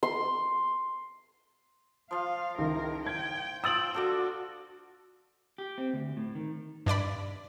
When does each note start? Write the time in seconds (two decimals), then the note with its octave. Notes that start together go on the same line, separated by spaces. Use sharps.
0.03 C6
2.11 F3 F4 F5
2.58 C#2 D#3 E4 A#4
3.06 G5 G#6
3.64 F4 G5 D#6 E6 A6 F#7
3.94 D4 F#4 A4 D5
5.58 G4
5.78 C4
5.93 D2
6.17 A2
6.35 D#3
6.86 G2 D4 D5 B5